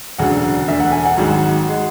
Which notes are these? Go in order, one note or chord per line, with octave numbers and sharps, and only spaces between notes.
E1 D2 C#3 F#3 F#5
E1 D2 D3 E5
F#5
G#5
F#5
G#1 G#2 F#3
G#3